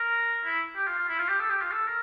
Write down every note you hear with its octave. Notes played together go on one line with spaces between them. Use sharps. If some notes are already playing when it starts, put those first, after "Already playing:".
Already playing: A#4
E4
G4
F4
F4
E4
F4
G4
A4
G4
F4
A4
A#4